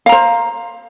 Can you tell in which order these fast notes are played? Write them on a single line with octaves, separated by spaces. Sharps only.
F5 A#5 C5